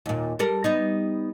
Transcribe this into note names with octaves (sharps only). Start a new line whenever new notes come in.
D#2 A#2
G3 A4 A#4
G3 B3 D#4